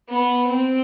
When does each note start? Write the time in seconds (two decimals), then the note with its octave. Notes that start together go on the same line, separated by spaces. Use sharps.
0.09 B3
0.48 C4